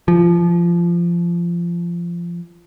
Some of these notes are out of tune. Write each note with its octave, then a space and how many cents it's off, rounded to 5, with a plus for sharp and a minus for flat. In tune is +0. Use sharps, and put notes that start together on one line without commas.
F3 -20